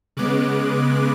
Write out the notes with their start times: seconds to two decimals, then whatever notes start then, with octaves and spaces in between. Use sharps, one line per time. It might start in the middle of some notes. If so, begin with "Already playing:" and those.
0.17 C#3 G#3 B3 D6 F#6